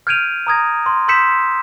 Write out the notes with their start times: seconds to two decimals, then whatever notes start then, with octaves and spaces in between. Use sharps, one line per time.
0.07 F6 G6 G#6 D7 D#7 F7
0.47 A#5 D#6 G#6 A#6
0.86 C6
1.08 C6 E6 G6 B6 C#7 E7